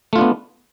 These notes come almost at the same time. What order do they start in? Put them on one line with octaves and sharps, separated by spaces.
A3 F4 D4 B3